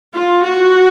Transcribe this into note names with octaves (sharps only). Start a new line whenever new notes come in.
F4
F#4